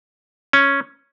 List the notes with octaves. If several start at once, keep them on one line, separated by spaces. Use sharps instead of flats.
C#4